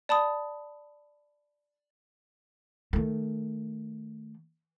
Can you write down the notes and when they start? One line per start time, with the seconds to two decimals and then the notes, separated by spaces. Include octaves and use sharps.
0.09 D5 A5 B5 D#6
2.93 D#3 A3